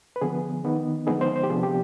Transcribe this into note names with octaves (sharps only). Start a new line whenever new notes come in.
B4
D3 F3 B3 G#4
D#3 B3 D#4
D3 F3 G#3 B3 D#4 G#4
C5
C5
G4
C3 F3 B3 D4 G#4
G4